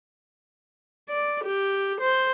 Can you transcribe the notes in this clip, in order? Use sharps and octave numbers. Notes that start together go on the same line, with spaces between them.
D5
G4
C5